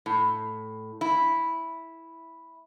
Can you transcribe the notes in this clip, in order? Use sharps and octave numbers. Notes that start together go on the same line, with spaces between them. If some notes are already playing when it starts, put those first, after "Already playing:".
A2
E4